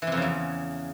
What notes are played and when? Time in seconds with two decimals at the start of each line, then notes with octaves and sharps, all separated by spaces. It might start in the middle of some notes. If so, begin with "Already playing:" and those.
0.02 E3
0.07 C3
0.12 F2
0.17 C#3
0.22 E2